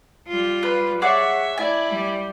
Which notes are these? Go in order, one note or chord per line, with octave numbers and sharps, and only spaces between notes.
G3 F4
B4
G#4 C#5 D5 E5 F#5
A3 E4 D5 G#5
G3